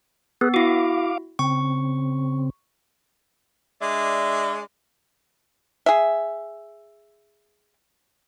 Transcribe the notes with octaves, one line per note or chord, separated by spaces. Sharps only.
B3 G#4 B4
E4 F#4 F5 D6
C#3 C4 C#6
G#3 D4 D5 E5
G#4 E5